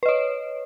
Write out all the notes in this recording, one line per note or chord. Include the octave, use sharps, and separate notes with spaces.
B4 C#5 D#5